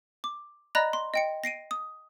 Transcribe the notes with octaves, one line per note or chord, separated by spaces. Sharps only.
D6
D5 D#5 A#5 B5 F#6 A#6
C6
D#5 G5 C#7
A#6 C7 D7 D#7
D#6